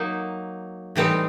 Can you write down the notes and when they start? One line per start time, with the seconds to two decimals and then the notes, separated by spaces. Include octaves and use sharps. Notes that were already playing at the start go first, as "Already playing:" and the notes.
Already playing: F#3 A#3 D#4
0.96 A2 E3 G3 C4 D#4